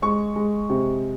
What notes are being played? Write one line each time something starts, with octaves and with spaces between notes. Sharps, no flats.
G#3 C#6
G#3
C3